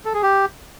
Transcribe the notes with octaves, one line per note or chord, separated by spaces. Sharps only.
A4
G#4
G4